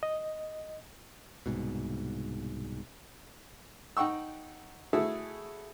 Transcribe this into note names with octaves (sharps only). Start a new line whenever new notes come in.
D#5
C2 G#2 B2
D#4 F#5 G5 C#6 E6
A3 E4 F#4 G#4 A4